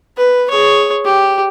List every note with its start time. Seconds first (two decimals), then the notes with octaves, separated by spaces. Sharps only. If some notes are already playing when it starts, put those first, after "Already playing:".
0.17 B4
0.50 G#4 C#5
1.05 G4